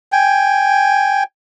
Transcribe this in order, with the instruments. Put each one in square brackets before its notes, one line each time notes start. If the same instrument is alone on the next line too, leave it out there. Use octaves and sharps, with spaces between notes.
[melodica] G5 G#5